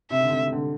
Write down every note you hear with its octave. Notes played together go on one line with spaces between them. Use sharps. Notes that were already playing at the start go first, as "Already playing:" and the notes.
C3 E5
D3
C3
C3
D3